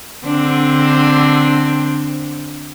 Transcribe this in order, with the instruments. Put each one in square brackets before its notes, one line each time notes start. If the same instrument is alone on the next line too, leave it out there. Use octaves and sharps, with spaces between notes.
[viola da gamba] D3 C4 D4